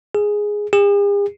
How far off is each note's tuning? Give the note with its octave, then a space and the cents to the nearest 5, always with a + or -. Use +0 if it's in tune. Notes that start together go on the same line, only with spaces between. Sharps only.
G#4 +0
G#4 -45